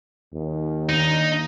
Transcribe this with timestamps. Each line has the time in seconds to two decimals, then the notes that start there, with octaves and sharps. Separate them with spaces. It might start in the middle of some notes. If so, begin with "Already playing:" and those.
0.33 D#2
0.89 D#3 A#3 D4 D#4